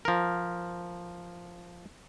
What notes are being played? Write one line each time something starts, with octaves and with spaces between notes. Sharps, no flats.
F3 A#4